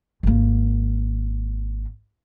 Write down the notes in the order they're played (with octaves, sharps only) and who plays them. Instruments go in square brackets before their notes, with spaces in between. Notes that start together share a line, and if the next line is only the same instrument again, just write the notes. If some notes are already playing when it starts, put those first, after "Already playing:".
[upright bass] G#1 A#3